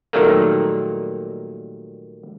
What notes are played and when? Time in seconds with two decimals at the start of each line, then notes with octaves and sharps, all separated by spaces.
0.13 A#2 D#3 F#3 G3 A3 A#3